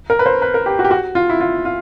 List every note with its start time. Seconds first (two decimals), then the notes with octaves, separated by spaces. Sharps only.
0.10 A#4
0.19 B4
0.26 C5
0.42 B4
0.54 A#4
0.66 G4
0.79 F#4
0.85 G4
0.91 F#4
1.15 F4
1.30 E4
1.40 F4
1.65 F4